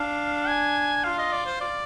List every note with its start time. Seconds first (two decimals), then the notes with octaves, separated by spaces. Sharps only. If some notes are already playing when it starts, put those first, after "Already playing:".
Already playing: D4 F5
0.48 G#5
1.04 F4 F5
1.18 D#5
1.32 D5
1.46 C5
1.61 D5